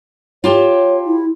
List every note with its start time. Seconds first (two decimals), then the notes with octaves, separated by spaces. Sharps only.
0.44 F4 G4 C#5 A5
1.06 E4